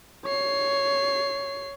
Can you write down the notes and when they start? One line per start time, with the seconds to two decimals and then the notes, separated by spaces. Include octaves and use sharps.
0.25 C#5 C7